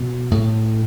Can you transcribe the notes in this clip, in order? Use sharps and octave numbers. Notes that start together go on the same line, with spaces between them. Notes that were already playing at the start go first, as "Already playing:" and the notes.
Already playing: B2
A2